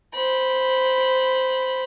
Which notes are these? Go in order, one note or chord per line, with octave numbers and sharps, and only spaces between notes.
C5 B5